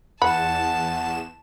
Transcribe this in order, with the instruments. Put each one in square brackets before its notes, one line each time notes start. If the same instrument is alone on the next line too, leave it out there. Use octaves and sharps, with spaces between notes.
[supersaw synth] E2 E7 [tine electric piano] F#5 [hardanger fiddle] A5 [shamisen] B5